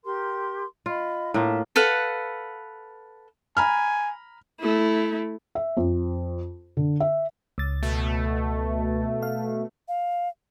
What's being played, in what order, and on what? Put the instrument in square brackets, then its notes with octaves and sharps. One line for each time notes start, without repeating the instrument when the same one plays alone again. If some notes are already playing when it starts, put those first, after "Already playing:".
[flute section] G4 A#4 C6
[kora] F4 [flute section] D#5 B5
[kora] A2 A#3 F4 [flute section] E5 A5
[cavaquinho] A4 B4 F5 F#5
[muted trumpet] G#5 [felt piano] A#5 B5 F6
[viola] A3 E4
[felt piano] E5
F2
D3
E5
[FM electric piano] C#2 A6
[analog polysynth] B2 A3
[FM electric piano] F5
[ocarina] F5